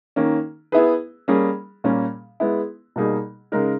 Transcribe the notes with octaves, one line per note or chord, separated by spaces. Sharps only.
D#3 A#3 C#4
B3 E4 G#4 B4
G3 A#3 C#4 G#4
A#2 G3 A#3 C#4
G#3 B3 E4
B2 G3 A#3 D#4 G#4
C#3 G#3 D#4 A#4